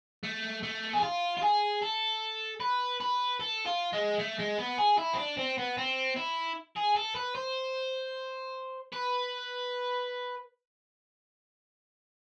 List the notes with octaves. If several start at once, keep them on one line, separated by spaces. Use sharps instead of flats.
A3
A3
G#4
F4
F4
G#4
A4
B4
B4
A4
F4
G#3
A3
G#3
B3
G#4
E4
C4
D4
C4
B3
C4
E4
G#4
A4
B4
C5
B4